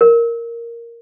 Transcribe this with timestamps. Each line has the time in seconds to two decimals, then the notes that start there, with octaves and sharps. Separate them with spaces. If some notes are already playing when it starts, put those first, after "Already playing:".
0.01 A#4